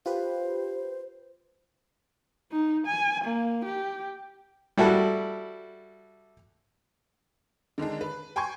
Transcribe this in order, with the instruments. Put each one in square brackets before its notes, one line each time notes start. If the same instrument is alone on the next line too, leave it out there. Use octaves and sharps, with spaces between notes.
[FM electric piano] F4 G4 B4 [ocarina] C5
[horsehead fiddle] D#4
G#5
A#3
G4
[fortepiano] G3 E4 F#4 A4
[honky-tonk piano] D3 D#3 G#3 D4
B4
G5 G#5 C6 C#6 G#6